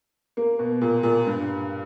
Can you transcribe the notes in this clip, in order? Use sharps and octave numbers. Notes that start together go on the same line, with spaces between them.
A#3
B2
A#2
A#2
G2